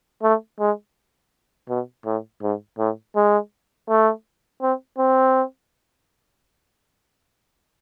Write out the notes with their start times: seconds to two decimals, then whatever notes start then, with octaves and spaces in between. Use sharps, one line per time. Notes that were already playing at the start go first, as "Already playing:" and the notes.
0.23 A3
0.60 G#3
1.69 B2
2.06 A2
2.42 G#2
2.78 A2
3.16 G#3
3.88 A3
4.62 C4
4.98 C4